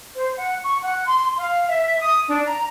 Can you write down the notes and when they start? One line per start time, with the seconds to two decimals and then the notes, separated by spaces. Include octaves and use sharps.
0.16 C5
0.35 F#5
0.63 C#6
0.81 F#5
1.06 C6
1.37 F5
1.68 E5
1.99 D#6
2.28 D4
2.45 A#5